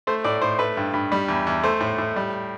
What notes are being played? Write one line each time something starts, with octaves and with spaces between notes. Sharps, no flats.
A3 C5
A2 D5
A2 C5
A3 B4
G2
G2
G3
E2
E2
A3 C5
A2
A2
G3